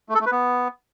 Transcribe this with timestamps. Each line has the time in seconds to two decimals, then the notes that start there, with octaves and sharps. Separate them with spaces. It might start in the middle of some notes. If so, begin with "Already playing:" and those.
0.09 A3
0.15 A4
0.20 A3
0.26 B4
0.32 B3